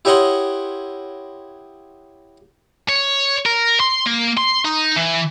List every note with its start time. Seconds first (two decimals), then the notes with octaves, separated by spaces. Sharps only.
0.05 E4 G4 C#5 D#5 F#5 C6
2.89 C#5
3.46 A#4
3.80 C6
4.06 A#3
4.37 C6
4.65 D#4
4.96 E3